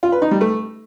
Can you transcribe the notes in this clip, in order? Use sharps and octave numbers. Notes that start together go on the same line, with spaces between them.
F4
B4
D#4
G3
A3